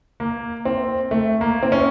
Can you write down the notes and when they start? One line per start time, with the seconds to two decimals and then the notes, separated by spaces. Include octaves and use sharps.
0.20 A#3
0.65 C4
1.11 A3
1.41 A#3
1.63 C4
1.72 C#4